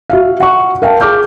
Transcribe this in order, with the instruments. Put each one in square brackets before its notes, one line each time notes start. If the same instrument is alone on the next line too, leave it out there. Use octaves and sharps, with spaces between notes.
[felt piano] F#4 E5 F5
F#5 C#6
A#4 F5 G5 A5
G#4 D6 F6 G6